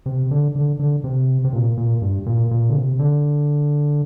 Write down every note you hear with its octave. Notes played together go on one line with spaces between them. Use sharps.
C3
D3
D3
D3
C3
C3
A#2
A#2
G2
A#2
A#2
D3
C3
D3